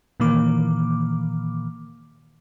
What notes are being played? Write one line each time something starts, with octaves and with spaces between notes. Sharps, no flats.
A#2 D#3 E3 A#3 D6